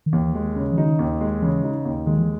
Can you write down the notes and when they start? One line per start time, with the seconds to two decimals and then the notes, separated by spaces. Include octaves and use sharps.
0.06 D#3
0.13 D#2 E3
0.35 G#3
0.56 C#3
0.72 E3
0.78 D#3 D#4
0.99 D#2
1.21 G#3
1.42 C#3 E3
1.63 D#4
1.85 D#2
2.06 D#3 G#3
2.18 E3